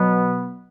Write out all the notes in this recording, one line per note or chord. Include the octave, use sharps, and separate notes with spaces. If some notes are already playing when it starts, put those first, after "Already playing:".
Already playing: B2 F#3 B3